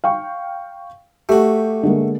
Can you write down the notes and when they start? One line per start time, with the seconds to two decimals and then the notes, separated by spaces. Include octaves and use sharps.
0.04 F5 G5 C#6
1.29 A3 F#4 G4
1.83 D3 G#3 A#3